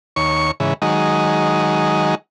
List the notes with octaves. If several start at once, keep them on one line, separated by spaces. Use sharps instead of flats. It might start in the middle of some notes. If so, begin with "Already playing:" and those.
D#2 C#5 C#6
G#2 C#3 E3
D#3 F#3 G#3 D#4